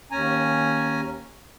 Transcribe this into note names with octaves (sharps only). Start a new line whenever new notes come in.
D#2 C#4 G#5 A#5